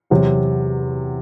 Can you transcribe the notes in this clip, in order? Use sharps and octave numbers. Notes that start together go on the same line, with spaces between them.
E2 C3 F#3